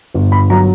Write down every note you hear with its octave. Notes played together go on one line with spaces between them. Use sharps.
G1
B5
F#3 A#5